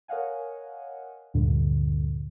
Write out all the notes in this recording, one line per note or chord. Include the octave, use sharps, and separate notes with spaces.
A#4 C#5 D#5 F5 F#5 G#5
D2 G2 A#2 D3